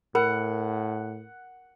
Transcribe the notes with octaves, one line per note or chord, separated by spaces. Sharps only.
A2 A#4 F#5 B5